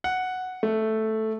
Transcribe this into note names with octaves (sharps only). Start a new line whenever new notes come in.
F#5
A3